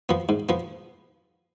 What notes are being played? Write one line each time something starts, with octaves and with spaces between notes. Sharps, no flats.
F3 B3
G#2
F3 B3